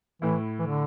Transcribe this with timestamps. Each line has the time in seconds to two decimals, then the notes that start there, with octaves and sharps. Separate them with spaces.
0.22 A2 E3 A3 E4
0.59 E3
0.67 D3